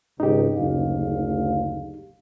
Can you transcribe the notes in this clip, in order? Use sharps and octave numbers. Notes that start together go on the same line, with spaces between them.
G#1 C#2 D#4 G4
F#1 D2 F5